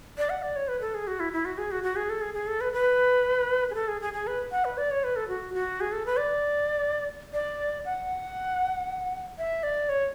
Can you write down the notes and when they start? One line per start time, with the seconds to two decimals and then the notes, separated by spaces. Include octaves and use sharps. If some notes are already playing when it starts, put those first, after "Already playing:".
0.18 D5
0.30 F#5
0.42 D5
0.56 C#5
0.68 B4
0.81 A4
0.94 G#4
1.07 F#4
1.20 E4
1.33 E4
1.45 F#4
1.58 G#4
1.71 F#4
1.83 F#4
1.96 G#4
2.10 A4
2.21 G#4
2.34 G#4
2.47 A4
2.61 B4
2.73 B4
3.71 G#4
3.75 A4
3.88 G#4
4.01 G#4
4.13 G#4
4.27 B4
4.51 F#5
4.65 B4
4.78 D5
4.91 C#5
5.04 B4
5.16 A4
5.28 F#4
5.54 F#4
5.81 G#4
5.92 A4
6.06 B4
6.18 D5
7.33 D5
7.85 F#5
9.38 E5
9.63 D5
9.89 C#5